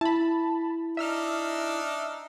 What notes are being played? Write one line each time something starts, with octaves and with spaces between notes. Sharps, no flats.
E4 A5 B5
D4 D#4 E5 E6 F6